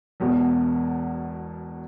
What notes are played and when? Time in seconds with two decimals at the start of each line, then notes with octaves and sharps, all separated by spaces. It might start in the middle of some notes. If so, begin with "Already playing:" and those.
0.20 E1 E2 B2